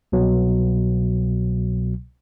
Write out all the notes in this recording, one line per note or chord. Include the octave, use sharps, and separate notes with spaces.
C2 B2 F#3